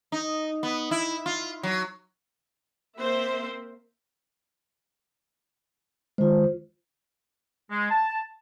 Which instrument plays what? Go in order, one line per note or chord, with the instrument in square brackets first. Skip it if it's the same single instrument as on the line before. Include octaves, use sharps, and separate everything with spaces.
[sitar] D#4
B3
E4
F4
F#3
[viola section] A#3 C4 A#4 C5 E5
[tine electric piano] D#3 G#3 [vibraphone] F4 C5
[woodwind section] G#3
A5